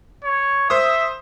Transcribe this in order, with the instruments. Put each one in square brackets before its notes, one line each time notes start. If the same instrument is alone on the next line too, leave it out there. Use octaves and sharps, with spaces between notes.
[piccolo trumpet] C#5
[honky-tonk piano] C5 D#6 [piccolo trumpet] E5